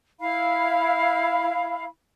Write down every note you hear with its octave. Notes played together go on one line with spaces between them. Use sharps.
E4 F5 B5